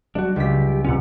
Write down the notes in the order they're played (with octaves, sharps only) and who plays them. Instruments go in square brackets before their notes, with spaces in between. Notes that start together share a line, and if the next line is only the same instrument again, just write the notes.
[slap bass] F#3 G3 [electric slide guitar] D4 F#4
[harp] C#2 B6 [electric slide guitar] G4
[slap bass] G2 C3 [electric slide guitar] C#4 F4 F#5